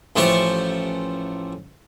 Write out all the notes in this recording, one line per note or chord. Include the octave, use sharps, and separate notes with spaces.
A1 F3 A3 G4 C5 C#6